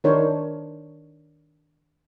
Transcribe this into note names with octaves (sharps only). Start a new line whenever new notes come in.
D#3 D4 D#4 A#4 C5 C#5